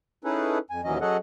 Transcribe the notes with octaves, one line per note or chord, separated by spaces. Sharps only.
C#4 D#4 E4 G#4 A4 B4
F2 G#5
D#2 A#2 E3 F#3 C#4 D#5
F#3 C#4 G#4 A4 D#5 F#5